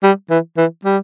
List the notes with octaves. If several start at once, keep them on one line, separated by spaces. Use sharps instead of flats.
G3
E3
E3
G3